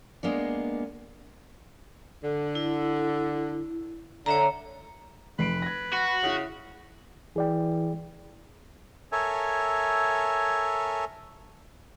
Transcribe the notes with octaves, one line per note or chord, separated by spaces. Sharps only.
G#3 A#3 B3 D4
D3
E4
D3 C#5 E5 A#5
F1 B4 C7 D7
G#6 A#6
F#4 B5
C#3 E4 F#5
E3 G#4 D5 G5
A4 A#4 C#5 E5 G#5